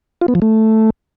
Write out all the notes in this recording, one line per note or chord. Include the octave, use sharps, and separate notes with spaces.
F4
B3
F3
A3